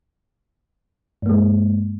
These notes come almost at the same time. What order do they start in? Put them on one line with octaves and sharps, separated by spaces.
G2 A#3 G#3